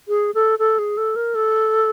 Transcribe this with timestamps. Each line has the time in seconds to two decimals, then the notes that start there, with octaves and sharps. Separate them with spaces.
0.08 G#4
0.35 A4
0.59 A4
0.79 G#4
0.97 A4
1.16 A#4
1.35 A4